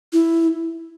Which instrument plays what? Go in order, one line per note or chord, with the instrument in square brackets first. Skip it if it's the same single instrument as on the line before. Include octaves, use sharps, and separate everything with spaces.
[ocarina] E4